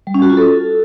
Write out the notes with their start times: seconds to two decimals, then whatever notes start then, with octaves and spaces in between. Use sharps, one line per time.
0.07 G3
0.14 C#4
0.22 F#4
0.30 F4
0.37 A4